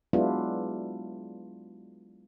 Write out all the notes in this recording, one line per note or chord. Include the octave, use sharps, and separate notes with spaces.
F#3 G#3 B3 D4 E4 F4